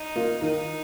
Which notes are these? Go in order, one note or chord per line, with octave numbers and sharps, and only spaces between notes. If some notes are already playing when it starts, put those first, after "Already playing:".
Already playing: D#4
A#3 F4
D#3 D#4